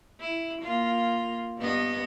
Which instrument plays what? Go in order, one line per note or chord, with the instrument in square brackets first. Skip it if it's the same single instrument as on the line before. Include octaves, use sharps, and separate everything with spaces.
[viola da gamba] E4
A#3 F4
G2 B3 D#5